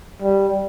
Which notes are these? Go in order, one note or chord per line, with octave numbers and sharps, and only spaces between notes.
G3